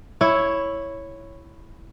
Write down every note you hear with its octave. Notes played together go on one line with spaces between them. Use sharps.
E4 C#5